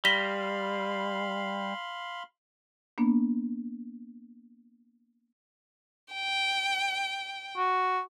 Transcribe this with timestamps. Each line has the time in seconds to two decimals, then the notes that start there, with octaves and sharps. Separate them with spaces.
0.05 G3 F5 B5 C6 A#6 B6 G7
2.98 A#3 B3 D4
6.14 G5
7.57 F#4